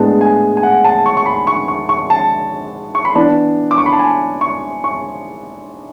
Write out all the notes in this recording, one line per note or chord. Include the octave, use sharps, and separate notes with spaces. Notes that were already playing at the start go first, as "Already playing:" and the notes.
Already playing: A2 G#3 B3 D4 A5
G#5
G#5
F#5
A5
C#6
C#6
B5
C#6
C#6
C#6
A5
C#6
B5
E3 B3 D4 A5
D6
C#6
B5
A5
G#5
C#6
C#6